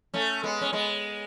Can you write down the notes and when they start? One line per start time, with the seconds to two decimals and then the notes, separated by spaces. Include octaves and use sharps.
0.14 A3 C#4
0.43 G#3 B3
0.61 C#4
0.73 G#3 B3